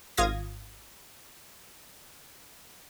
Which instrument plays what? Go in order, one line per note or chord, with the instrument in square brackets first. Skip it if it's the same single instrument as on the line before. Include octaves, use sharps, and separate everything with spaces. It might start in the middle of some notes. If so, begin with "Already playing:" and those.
[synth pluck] G#1 F4 F5 D#6 G#6 A#6